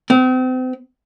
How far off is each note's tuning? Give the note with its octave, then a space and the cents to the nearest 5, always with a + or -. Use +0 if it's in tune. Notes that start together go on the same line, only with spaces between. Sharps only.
C4 -35